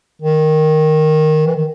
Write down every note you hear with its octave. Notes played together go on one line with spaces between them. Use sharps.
D#3
E3
D#3